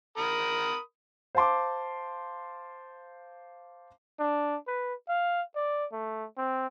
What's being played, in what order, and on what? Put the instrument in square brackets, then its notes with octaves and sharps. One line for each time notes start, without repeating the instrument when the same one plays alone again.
[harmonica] A#4 B5 D#6
[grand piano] C5 F5 A5 C6 D6
[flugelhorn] D4
B4
F5
D5
A3
C4